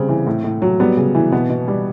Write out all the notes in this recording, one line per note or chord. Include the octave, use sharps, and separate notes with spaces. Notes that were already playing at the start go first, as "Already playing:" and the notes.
Already playing: C#3 G3 C4
E3
A2
A2
F#3
G3 B3
C#3
E3
B2 B3
B2
G3